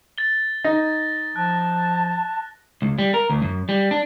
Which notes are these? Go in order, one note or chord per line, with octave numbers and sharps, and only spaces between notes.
A6 G7
D#4 A#6
F3 A5 F#6
C#2
G3
A#4
D2
F#2
G3
D4